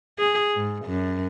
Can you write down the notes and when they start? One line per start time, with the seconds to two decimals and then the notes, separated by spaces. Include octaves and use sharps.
0.19 G#4
0.56 G#2
0.86 F#2